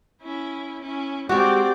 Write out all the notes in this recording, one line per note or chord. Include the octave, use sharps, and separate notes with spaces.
C#4 E4
C#4 E4
G#3 C4 F#4 G4 D5